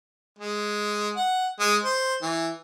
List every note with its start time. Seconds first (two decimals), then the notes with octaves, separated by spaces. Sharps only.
0.39 G#3
1.16 F#5
1.60 G#3
1.84 C5
2.22 E3